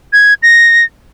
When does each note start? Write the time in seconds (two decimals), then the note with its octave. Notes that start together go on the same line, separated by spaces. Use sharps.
0.13 G#6
0.43 A#6